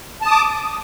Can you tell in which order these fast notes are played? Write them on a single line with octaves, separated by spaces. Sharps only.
A5 D#6 D6